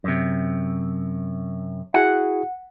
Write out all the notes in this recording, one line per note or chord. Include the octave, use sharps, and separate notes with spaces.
F#2 C3
E4 F#4 G#4 F#5